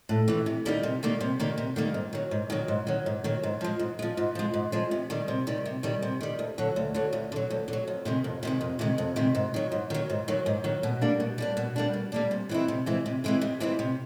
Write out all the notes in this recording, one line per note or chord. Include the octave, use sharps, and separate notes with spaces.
A2
E3 A3
C3
D#3 G3 A#3 D#4
C3
D#3 G3 A#3 D#4
C3
D#3 G3 A#3 D#4
C3
D#3 G3 A#3 D#4
G#2
D#3 F#3
G#2
D#3 F#3
G#2
D#3 F#3
G#2
D#3 F#3
G#2
F3 G#3
G#2
F3 G#3
G#2
F3 G#3
G#2
F3 G#3
C3
D#3 G3
C3
D#3 G3
C3
D#3 G3
C3
D#3 G3
D2
D3 F#3
D2
D3 F#3
D2
D3
F#3
D2
D3
F#3
F2
C3 D#3 G#3
F2
C3 D#3 G#3
F2
C3 D#3 G#3
F2
C3 D#3 G#3
G#2
D#3 F#3
G#2
D#3 F#3
G#2
D#3 F#3
G#2
D#3 F#3
B2
G3 A#3 D4
B2
G3 A#3 D4
B2
G3 A#3 D4
B2
G3 A#3 D4
C3
E3 G#3 C4 E4
C3
E3 G#3 C4 E4
C3
E3 G#3 C4 E4
C3
E3 G#3 C4 E4
C3